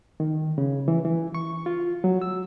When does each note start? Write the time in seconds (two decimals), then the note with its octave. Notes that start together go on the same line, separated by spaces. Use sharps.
0.20 D#3
0.58 C#3
0.88 E3
1.05 E3
1.35 C#6
1.66 F4
2.04 F#3
2.22 E6